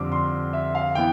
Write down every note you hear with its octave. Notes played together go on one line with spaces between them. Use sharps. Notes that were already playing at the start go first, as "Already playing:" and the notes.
Already playing: F2 D3 G3 C4 D6
C6
E5
F5
E3 B3 G5